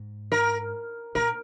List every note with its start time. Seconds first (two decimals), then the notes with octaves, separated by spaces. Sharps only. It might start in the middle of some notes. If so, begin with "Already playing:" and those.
Already playing: G#2
0.32 A#4
1.15 A#2 A#4